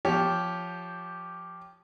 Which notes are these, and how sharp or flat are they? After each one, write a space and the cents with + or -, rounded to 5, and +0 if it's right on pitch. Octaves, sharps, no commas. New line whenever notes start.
F3 +0 G4 +0 C#5 +10